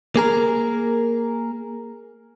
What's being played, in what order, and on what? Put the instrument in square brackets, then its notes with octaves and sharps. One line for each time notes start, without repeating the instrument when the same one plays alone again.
[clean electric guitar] A#3 G#4 A#4